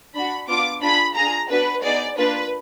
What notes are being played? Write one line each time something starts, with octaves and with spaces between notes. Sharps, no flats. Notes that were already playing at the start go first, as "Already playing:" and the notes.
D4 F#4 B5
B3 D4 F4 D6
D4 F4 G#4 B5
D4 F4 G#4 A#5
B3 D4 F#4 B4
B3 D#4 G#4 D5
A#3 D4 F4 B4